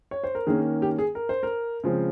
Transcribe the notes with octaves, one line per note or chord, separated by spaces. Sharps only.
C#5
C5
A#4
D#3 A#3 C#4 G#4
G4
G#4
A#4
C5
A#4
C#3 F3 G#3 C4